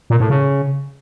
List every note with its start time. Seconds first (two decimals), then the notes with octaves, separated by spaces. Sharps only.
0.10 A#2
0.20 A2
0.30 C#3